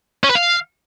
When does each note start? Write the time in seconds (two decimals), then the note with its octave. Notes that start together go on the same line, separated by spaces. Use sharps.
0.24 C#4
0.29 B4
0.35 F5